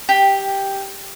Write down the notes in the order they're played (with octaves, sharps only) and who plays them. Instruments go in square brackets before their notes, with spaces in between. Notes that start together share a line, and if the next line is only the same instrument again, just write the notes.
[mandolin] G4